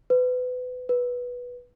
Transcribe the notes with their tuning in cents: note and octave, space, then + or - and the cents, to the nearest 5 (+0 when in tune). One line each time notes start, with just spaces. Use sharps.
B4 +30
B4 -10